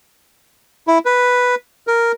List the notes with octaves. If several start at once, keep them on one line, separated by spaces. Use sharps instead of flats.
E4
B4
A#4